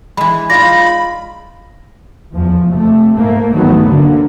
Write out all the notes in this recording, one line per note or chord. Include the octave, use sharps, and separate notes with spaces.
E3 G#3 B5
D#4 F4 D5 B5 A#6
E2 F3
C3 A3
G#2 A3 A#3
G2 D#3 F#3 A3 B3
D2 D3 A#3